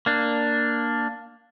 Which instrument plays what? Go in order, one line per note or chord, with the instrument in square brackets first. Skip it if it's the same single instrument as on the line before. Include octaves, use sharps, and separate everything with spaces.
[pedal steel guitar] A#3 D4